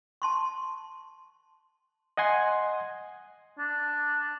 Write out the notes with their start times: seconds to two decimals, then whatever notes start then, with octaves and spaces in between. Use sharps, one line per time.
0.22 A5 C6 C#6
2.17 D#5 F#5 G#5 C6
3.59 D4